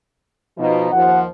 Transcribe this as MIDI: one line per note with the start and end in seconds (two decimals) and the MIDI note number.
0.57 0.90 47
0.57 0.90 53
0.57 0.90 63
0.93 1.25 39
0.93 1.25 53
0.93 1.20 78